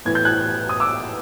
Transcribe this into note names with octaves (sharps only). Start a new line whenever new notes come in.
A2 E3 G#6
G6
F#6 G#6
D#6
D6 E6